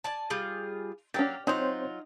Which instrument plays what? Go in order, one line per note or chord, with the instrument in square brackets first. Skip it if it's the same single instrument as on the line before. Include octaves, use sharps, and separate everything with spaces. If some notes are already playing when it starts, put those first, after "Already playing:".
[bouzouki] D5 G#5 A5
G3 F4 G#4
[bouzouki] F#3 A#3 [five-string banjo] C#4 G4 [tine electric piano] A6
[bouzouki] F#3 F4 [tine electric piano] C4 C5 C#5 [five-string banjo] D#4